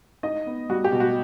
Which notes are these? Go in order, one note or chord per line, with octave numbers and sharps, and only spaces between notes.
D#4 D#5
B3
G3 F#4
G4
B2
F#4